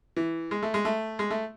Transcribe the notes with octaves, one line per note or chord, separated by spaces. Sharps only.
E3
G#3
A3
G#3
A3
G#3
A3